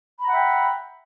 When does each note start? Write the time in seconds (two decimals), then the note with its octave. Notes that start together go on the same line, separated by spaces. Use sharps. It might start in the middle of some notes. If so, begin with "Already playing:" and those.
0.20 B5
0.24 A#5
0.27 F#5
0.31 E5
0.35 G5